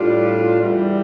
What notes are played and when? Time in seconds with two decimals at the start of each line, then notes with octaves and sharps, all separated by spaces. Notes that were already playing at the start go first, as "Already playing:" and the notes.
Already playing: A2 G3 D4 F4
0.59 E2 E3 G3